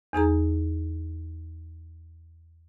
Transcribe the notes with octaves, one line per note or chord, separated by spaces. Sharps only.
E2 D#4 G#4 A#5